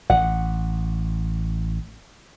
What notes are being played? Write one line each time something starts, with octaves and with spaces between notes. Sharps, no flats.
A1 F#5